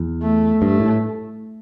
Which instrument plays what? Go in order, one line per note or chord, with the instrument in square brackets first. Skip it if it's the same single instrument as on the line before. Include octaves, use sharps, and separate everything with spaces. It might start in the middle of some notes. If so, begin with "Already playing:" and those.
Already playing: [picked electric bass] E2
[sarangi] A3
[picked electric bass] G2 [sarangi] A3
[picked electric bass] A2